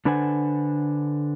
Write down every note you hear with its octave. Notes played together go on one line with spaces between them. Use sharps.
D3 D4 B4 C5 F#5 G#5